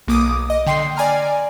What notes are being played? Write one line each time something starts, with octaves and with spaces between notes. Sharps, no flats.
B1 A#3 D6 D#6
D#5
D3 G5 C6 C7
D5 G#5 A#5 F6